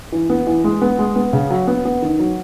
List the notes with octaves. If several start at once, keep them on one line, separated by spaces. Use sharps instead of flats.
E3
B3
E3
G#3
B3
G#3
B3
C#3
F#3
B3
B3
D#3
F#3